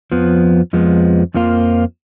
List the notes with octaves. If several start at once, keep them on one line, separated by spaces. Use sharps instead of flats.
F2 F3 B3
F2 F3 G#3 B3
F2 F3 A#3 F4